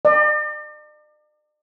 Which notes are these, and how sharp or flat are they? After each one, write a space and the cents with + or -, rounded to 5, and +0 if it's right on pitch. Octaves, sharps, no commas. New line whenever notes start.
D5 +45